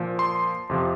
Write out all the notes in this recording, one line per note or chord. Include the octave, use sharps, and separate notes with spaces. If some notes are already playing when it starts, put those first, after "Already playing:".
Already playing: A#2 F3
C6
F2 C3 F3